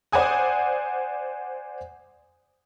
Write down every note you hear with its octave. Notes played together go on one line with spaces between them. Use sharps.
C5 D5 F#5 G#5 D#6